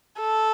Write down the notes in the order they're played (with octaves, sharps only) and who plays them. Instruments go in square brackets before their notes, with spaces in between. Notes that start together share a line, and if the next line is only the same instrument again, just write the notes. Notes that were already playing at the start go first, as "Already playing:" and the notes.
[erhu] A4